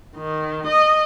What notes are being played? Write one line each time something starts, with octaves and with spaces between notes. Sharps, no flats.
D#3
D#5